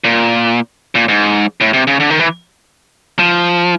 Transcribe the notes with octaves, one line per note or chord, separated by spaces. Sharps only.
A#2
A#2
G#2
A2
C3
C#3
D3
D#3
E3
F3